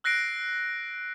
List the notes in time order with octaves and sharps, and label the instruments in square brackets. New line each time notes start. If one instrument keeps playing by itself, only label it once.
[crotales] E6 F#6 A#6 C7 D7